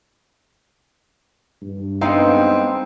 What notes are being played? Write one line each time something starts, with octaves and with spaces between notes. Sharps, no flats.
G2
G#3 B3 C4 D#4 F5